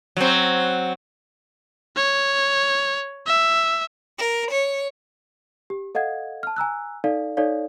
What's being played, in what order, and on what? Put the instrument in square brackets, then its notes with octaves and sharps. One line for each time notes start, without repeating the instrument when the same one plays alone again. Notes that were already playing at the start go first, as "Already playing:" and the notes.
[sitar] F#3 C4
[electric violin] C#5
E5
[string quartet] A#4
C#5
[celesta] G4
A4 D#5 F5 F#5 G#6
A5 F6
G#5 A#5 E6 F#6
D#4 A4 D5 F5
D#4 A4 C#5 D5 F5